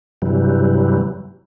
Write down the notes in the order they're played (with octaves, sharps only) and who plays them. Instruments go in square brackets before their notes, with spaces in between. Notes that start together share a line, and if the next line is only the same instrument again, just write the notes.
[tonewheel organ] G2 C3 E3 F#3 G3